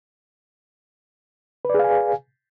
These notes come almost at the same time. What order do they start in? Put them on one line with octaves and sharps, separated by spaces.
B4 D5 G#4 F5 G#5